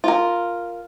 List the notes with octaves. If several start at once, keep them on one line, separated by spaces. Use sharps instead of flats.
F4 A#4